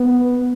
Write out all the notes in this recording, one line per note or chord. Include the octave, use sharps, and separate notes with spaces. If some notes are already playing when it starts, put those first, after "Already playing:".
Already playing: B3